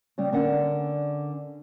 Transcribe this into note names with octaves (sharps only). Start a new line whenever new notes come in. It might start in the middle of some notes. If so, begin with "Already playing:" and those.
C#3 G3
D3 C#4 A#4 D5 F#5